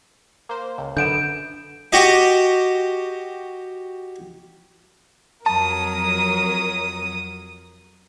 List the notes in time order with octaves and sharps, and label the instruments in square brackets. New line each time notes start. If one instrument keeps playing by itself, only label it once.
[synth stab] A#3 C5
C#2
[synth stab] F#2 B3 [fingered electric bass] D3 [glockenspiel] G6 D7 E7
[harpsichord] F#4 G4 D#5
[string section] F2 F#3 [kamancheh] A#4 [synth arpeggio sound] A5 [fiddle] D#6